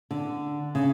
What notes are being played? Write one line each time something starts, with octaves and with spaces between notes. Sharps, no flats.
D3
C#3